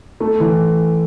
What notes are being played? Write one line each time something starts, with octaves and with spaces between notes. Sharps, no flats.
A3
E3